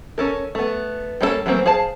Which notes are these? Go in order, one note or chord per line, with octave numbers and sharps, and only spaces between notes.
C#4 A4 A#4
A3 B3
G3 A#3 C#4 F4 A4
E3 F#3 A3 A#3 C4
G#4 C5 F5 A5